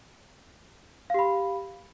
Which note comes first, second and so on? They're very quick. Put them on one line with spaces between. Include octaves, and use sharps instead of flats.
F5 G4 B5